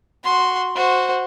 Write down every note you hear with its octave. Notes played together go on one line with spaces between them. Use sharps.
F#4 C6
F#4 C5